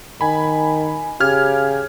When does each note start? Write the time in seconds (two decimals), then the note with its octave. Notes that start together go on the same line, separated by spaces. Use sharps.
0.21 D#3 G#5 B5
1.20 C#3 G4 F6 G#6